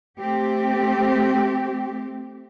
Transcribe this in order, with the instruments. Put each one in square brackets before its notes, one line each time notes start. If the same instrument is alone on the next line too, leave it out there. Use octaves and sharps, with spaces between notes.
[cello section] A3 C4 G4